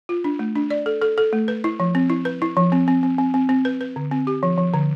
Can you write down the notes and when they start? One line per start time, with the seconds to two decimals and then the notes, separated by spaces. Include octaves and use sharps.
0.09 F4
0.24 D4
0.39 A3
0.56 D4
0.70 D5
0.86 A4
1.02 A4
1.18 A4
1.33 A3
1.48 B4
1.64 E4
1.80 F3
1.95 C4
2.10 E4
2.25 B4
2.42 E4
2.57 F3
2.72 C4
2.88 C4
3.03 C4
3.18 C4
3.34 C4
3.49 C4
3.65 B4
3.81 B4
3.96 D3
4.11 C4
4.27 G4
4.43 F3
4.58 F3
4.74 D3